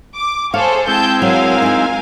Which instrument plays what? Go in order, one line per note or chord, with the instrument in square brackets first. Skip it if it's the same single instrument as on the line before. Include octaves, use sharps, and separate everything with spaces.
[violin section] D6
[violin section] G#4 A4 C5 [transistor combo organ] C#5 [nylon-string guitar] F5
[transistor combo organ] G#3 C4 E4 [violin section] G5 A5 G6
[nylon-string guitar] F#3 [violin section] A#4 F5 G#5
[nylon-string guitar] D#4 F4